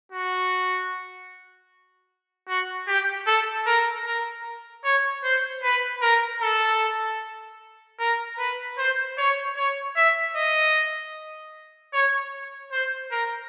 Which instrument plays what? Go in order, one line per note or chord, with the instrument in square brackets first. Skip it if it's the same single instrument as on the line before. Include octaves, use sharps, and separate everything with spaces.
[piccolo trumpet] F#4
F#4
G4
A4
A#4
A#4
C#5
C5
B4
A#4
A4
A#4
B4
C5
C#5
C#5
E5
D#5
C#5
C5
A#4